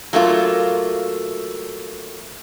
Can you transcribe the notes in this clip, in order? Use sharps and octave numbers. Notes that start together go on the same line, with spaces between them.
F#3 A3 A#3 F4